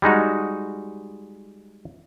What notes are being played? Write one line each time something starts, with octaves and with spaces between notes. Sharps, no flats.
G3 G#3 D#4 F#4